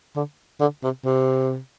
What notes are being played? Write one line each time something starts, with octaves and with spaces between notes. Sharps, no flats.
D3
D3
C3
C3